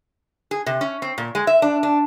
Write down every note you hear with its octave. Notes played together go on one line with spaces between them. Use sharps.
G#4
C3
C#4
C4
A#2
G#3
E5
D4
D4